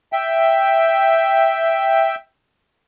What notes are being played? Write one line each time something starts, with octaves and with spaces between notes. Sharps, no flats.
E5 G5